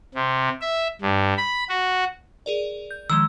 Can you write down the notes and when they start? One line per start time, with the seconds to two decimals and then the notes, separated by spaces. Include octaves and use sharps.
0.15 C3
0.61 E5
1.02 G2
1.37 B5
1.69 F#4
2.46 G#4 A#4 D5
2.91 G6
3.10 D#3 F3 G#3 E6